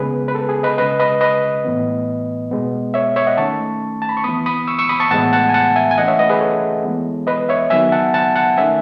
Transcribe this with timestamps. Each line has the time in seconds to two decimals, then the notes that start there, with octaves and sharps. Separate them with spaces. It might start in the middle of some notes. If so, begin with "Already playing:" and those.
Already playing: C#3 G#3 B3 G#4 B4
0.28 B4
0.35 A4
0.49 G#4
0.63 B4 D#5
0.78 C#3 G#3 C#4 B4 D#5
1.00 B4 D#5
1.21 B4 D#5
1.65 A2 E3 B3
2.51 B2 G#3 B3
2.94 C#5 E5
3.16 C#5 E5
3.27 D#5 F#5
3.37 D#3 A3 C#4 A5 C#6
4.02 A5
4.09 B5
4.17 C#6
4.24 E3 B3 B5 D#6
4.46 B5 D#6
4.67 C#6 E6
4.79 C#6 E6
4.89 B5 D#6
5.00 A5 C#6
5.11 A2 E3 G#3 B3 F#5 A5
5.33 F#5 A5
5.49 G#5
5.54 F#5 A5
5.76 E5 G#5
5.91 G#5
5.98 E3 A3 C#4 D#5 F#5
6.08 C#5 E5
6.19 B4 D#5
6.30 G#4 B4
6.40 A4 C#5
6.84 E3 G#3 B3
7.27 B4 D#5
7.49 C#5 E5
7.70 D#3 F#3 B3 E5 G#5
7.92 F#5 A5
8.14 F#5 A5
8.36 F#5 A5
8.57 D#3 A3 C#4 E5 G#5